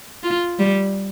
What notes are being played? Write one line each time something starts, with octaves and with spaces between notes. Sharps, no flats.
F4
G3